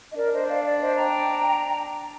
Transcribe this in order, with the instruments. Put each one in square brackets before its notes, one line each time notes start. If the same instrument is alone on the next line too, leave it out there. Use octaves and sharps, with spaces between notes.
[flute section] D#5
[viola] D4 [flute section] A#4 D5
[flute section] C5 D#5
D5 F5
D5 F5
C5 D#5
G5 A#5